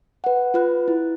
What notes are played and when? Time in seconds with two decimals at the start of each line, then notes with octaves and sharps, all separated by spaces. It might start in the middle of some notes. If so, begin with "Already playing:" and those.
0.24 B4 F#5
0.54 F4 B4 F#6
0.88 E4